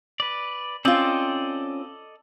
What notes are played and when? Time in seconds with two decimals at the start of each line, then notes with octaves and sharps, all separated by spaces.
0.20 B4 D5
0.85 C4 C#4 F4 A4 D5 D#5